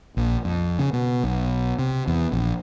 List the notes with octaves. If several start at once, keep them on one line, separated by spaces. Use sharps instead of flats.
A#1
F2
C#3
B2
B1
C3
E2
A#1